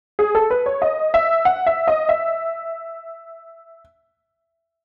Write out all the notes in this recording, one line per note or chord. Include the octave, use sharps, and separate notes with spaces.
G#4
A4
B4
C#5
D#5
E5
F#5
E5
D#5
E5